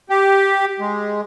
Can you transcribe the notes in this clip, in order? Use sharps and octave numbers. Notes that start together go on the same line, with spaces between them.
G4
G#3